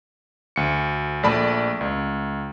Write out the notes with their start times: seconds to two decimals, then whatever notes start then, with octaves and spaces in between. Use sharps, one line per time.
0.56 D2 C#7
1.23 A#1 A3 D5 A5 B5
1.81 C#2